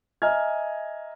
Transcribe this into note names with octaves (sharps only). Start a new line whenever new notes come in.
D#5 E5 G#5 A#5 F6 G#6